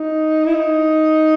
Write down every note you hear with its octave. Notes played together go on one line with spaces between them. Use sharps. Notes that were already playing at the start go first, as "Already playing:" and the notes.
Already playing: D#4
E4
D#4